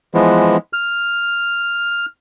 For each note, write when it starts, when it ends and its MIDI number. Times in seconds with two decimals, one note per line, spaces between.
0.14 0.57 52
0.14 0.57 53
0.14 0.57 56
0.14 0.57 59
0.73 2.06 89